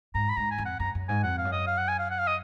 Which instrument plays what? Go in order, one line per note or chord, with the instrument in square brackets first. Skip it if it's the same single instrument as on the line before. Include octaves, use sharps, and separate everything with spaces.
[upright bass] G#2 [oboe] A#5
[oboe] B5
[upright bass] G#2 [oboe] A#5
[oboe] G#5
[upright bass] F2
[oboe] F#5
[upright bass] F#2 [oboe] A#5
[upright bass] F#2
[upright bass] G#2 [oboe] G#5
[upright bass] F2 [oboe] F#5
[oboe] F5
[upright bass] F#2
[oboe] D#5
F5
F#5
G#5
F5
F#5
F5
D#5